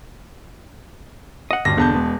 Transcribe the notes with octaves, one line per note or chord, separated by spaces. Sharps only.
D#5 F#5
D#1 D2 G2 A#6
E1 D3 B3 A5 G6
G#3 B3